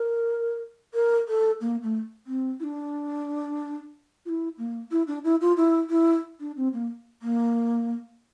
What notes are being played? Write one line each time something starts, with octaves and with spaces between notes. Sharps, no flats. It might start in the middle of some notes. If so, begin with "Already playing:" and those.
Already playing: A#4
A#4
A4
A#3
A3
C4
E4
D4
F4
E4
A#3
E4
D4
E4
F4
E4
E4
D4
C4
A#3
A#3